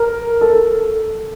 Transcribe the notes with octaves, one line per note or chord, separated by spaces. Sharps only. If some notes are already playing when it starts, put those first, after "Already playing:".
Already playing: A#4
A4